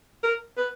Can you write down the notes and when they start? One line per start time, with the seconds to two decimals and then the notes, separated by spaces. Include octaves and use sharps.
0.23 A#4
0.57 B4